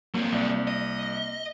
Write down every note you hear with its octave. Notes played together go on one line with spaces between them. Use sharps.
F#3 A#3 C4
C2 D5
D#5